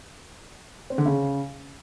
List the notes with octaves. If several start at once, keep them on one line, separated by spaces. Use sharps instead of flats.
C4
D3
C#3